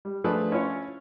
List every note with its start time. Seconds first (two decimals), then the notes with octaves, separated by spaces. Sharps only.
0.05 G3
0.24 F3 A3 D4 G#4 B4
0.52 C#4 E4 F4 C#5